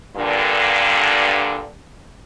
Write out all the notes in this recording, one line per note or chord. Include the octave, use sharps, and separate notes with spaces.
G2 A#2 D3